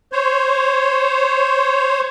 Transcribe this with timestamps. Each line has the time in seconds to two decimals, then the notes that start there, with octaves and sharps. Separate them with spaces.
0.12 C5 C#5